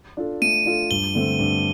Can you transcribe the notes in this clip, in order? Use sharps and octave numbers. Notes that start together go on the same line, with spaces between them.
D4 F4 A4
A3 D#7
D4 F4 A4
G2 G7
D3 A3 C4
G2